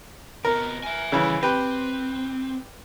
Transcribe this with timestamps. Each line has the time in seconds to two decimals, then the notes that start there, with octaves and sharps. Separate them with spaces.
0.45 C3 B3 A#4
0.83 E5 G#5
1.12 D#2 C#3 E3 G3
1.43 C4 G4 B4